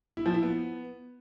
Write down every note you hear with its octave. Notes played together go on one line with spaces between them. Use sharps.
E4
F3
E4
B3